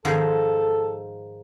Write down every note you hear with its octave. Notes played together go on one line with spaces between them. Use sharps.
G#2 D#3 F3 A4